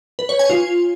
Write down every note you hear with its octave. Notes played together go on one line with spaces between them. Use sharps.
B4
C#5
G#5
F4